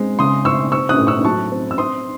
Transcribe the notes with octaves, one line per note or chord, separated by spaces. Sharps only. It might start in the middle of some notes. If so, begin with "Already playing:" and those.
Already playing: G#3 C4
C#3 C6 D#6
C4 C#6 E6
C4 C#6 E6
D#6 F#6
A2
C#6 E6
F#3 A5 C#6
C4
E6
C4 C6 D#6